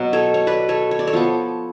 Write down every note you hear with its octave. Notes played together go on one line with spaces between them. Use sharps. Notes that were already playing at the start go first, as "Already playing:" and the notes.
Already playing: B2 F#3 B3
A4 C#5
C#5
B4 D5
A4 C#5
C#5
D5
A4 C#5
F3 B3